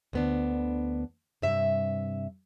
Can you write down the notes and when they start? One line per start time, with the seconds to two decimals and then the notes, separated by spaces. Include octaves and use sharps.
0.13 D2 B3 D4
1.42 G2 C3 E5